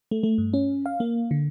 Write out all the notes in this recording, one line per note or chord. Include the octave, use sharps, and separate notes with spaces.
A3
A3
G2
C#4
F5
A#3
D3